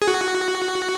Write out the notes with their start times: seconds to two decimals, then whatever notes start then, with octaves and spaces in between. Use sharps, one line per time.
0.02 G#4
0.08 F#4